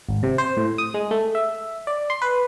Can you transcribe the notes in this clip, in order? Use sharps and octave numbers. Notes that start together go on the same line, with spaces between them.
G#1
C3
C5
A2
D#6
G#3
A3
E5
D5
C6
B4